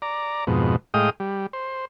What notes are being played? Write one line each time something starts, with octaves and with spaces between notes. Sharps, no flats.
D5 A#5
F2 G#2 B2
A2 G#3 D#5 F5 G5 D#6
G3
C5